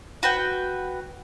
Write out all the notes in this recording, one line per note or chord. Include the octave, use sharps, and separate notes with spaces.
F#4 B4 G5